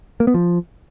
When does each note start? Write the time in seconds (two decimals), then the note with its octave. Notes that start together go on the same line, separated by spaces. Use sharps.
0.20 A#3
0.27 B3
0.34 F3